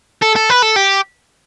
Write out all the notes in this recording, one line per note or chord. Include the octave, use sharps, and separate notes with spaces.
A4
A4
B4
A4
G4